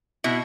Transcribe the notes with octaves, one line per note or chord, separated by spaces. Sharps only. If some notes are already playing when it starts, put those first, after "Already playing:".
B2 E4